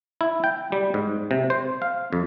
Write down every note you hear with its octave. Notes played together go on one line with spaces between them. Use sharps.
E4
G5
G3
G#2
C3
C5
F5
F2